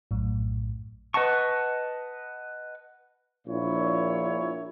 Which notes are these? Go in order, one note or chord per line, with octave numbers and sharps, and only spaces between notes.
A#1 F#2 A2
B4 D#5 F#5 A5 C#6
A#1 A#2 E4 C#5